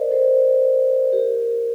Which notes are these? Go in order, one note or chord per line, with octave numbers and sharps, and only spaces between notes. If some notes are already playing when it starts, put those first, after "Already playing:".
Already playing: A#4 C5 D5 D#5
A4 C5
G4 A#4